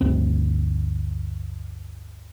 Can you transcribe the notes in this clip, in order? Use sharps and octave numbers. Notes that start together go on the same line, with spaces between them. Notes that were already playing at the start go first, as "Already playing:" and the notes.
G1 D2 C4